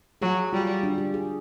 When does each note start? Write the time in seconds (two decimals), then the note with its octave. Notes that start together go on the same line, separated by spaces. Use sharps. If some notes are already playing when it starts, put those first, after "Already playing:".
0.22 F#3 G#4
0.53 G3 F4
0.83 D4
0.98 G4
1.14 G#4